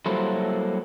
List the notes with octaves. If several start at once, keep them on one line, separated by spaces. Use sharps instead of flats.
F#3 G3 A#3 E4 A4 C5